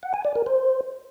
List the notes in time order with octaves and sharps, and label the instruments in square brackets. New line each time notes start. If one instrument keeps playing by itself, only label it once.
[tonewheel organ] F#5
G#5
D5
A#4
C5